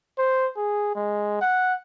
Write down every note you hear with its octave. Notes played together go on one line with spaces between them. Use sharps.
C5
G#4
G#3
F#5